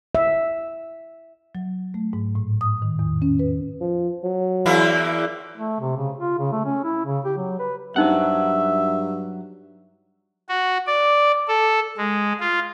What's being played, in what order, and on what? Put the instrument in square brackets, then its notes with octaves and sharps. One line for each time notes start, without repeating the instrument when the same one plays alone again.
[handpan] E5
[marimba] F#3
A3
G#2
A2
D#6
D#3
E2
C#4
B4
[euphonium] F3
F#3
[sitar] E2 A#3 E4
[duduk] A3
C3
C#3
F4
C#3
A3
C#4
E4
C#3
G4
F#3
B4
[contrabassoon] G2 [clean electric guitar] F#3 F#5 [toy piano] C#4 D#4 C5 [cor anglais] E5
[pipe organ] F#4
D5
A4
G#3
F4